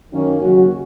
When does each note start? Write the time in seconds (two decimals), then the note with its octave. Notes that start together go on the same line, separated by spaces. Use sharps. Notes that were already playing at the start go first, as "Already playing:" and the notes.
0.12 F#2 D#3 A#3 C#4
0.41 D#2 C#3 F#3 C#4 F#4